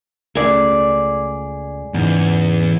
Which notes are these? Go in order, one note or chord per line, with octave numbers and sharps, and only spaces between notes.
C#2 A3 C#4 G#4 D5
E2 G#2 C#3